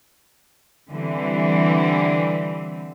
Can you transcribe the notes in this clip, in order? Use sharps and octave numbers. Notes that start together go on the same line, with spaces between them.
D3 E3 G3 C4